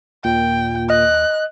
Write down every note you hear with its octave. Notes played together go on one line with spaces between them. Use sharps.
D#2 A#2 G5
D#5 F#6